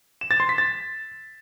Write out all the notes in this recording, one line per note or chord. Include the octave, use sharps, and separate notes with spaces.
E7
A6
C6
B6
A6